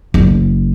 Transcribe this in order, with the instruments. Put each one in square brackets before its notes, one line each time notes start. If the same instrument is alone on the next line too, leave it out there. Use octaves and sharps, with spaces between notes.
[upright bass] F#1